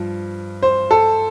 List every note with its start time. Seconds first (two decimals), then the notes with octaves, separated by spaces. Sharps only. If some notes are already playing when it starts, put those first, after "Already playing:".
Already playing: G2 F3
0.62 C5
0.91 A4